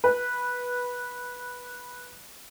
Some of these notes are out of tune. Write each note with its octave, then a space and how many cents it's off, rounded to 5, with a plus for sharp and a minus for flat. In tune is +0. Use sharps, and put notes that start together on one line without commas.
B4 -10